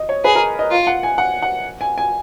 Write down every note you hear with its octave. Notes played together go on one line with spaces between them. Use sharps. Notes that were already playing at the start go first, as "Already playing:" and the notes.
Already playing: D#5
C#5
G#4 B4
A#4
D#5
F4
F#5
G#5
F#5
F#5
G#5
G#5